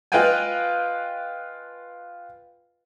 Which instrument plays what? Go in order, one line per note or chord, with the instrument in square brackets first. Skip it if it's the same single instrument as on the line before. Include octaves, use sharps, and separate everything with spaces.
[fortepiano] F4 B4 D#5 F5 G5 G#5